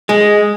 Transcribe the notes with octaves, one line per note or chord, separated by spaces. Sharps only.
G#3